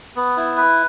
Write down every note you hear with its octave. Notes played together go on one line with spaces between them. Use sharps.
B3
E4
B4